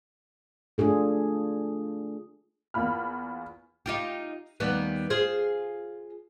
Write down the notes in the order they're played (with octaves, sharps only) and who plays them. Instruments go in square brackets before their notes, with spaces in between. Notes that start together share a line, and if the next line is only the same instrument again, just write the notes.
[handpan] A3 D4 F4 G#4 A4
[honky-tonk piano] E2 A#3 F4 B5 F6
[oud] D#4 F4 G4
D#2 G3 B3
F4 G#4 C5